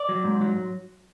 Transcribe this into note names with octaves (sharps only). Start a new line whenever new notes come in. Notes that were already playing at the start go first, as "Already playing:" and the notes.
Already playing: D5
F#3
G#2
F#3